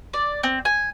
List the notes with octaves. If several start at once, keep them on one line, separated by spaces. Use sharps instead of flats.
D5
C4
G#5